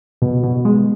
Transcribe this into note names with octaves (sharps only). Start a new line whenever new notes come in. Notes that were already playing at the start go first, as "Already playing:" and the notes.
B2
B2
G#3